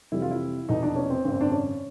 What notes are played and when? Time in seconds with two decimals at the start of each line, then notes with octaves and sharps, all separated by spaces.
0.12 F2 C3 E3 G3 E4
0.22 F4
0.31 E4
0.69 F1 E2 B2 D#4
0.83 D4
0.96 C#4
1.10 C4
1.25 G#1 F#2 C#3 C4
1.41 D4
1.52 C#4